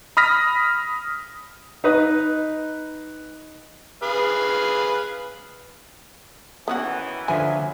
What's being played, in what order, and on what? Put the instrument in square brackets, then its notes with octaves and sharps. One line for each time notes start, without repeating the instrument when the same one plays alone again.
[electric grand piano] B5 D#6 F6 A#6 B6
[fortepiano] D#4 B4 D#6
[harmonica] G#4 B4 F5
[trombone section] D#3 E3 [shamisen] B3 C#4 F#4
[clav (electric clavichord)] D3 F3 B4 [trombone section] F#3 [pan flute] E5 [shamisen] G#5